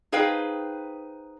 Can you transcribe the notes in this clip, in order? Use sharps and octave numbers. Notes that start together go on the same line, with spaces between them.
D#4 G#4 B4 C5 F5 G5